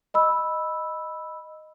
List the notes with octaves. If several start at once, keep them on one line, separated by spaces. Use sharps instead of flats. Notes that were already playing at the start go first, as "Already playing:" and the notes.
D#5 B5 E6